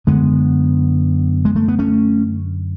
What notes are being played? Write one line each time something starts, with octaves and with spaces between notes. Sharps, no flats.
F#2 D3 G#3 B3
G#3
A3
B3
A3 C#4